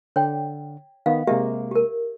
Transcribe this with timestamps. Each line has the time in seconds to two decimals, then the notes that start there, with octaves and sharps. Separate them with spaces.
0.16 D3 C#5 G5
1.06 D#3 B3 F5
1.27 C3 G#3 A#3 G4 E5
1.71 G4 A#4